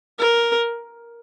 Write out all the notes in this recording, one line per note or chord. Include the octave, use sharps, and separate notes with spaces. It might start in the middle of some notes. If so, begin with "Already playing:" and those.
A#4